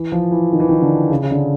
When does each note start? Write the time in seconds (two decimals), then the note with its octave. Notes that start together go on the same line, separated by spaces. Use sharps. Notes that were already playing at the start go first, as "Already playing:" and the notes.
Already playing: E3
0.12 F3
0.31 E3
0.52 D#3
0.60 E3
0.69 D#3
0.82 D3
1.10 C#3
1.23 C#3
1.31 D3